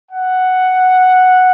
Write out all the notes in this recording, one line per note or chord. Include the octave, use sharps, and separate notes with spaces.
F#5